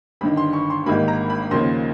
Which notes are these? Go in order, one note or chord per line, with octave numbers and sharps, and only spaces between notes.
G1 G2 D#3 B5
C6
C#6
C6
G#1 G#2 D#3 G3 A#3 B5
A#5
B5
D#2 C#3 F3 A#3 C6